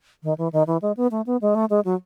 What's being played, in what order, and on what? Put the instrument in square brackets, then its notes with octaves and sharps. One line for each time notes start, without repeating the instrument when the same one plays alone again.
[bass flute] D#3
E3
D#3
E3
G#3
B3
A3
B3
G#3
A3
G#3
F#3